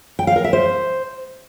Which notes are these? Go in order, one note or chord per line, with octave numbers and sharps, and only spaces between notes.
G5
F5
A#4
E5
C5